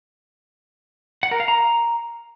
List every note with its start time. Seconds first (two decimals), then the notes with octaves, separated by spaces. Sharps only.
1.23 F#5
1.31 A#4
1.40 F5
1.48 A#5